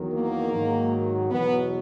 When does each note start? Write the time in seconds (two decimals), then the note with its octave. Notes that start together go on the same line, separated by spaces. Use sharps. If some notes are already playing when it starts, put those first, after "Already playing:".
Already playing: E2 D#3 F#3
0.13 A#3
0.52 G#2 D#3 F#3
1.31 E2 B2 F#3 B3